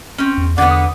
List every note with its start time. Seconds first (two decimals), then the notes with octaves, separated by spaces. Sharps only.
0.18 C4 C#4
0.37 E2
0.58 E2 D3 B3 D5 F#5
0.71 D#6